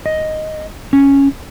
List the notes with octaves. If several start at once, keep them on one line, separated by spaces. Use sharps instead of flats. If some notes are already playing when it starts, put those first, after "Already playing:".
D#5
C#4